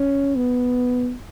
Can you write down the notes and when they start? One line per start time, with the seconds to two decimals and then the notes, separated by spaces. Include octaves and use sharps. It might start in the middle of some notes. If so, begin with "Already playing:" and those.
Already playing: C#4
0.36 B3